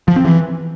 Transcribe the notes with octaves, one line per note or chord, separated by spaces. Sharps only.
F3
C4
E3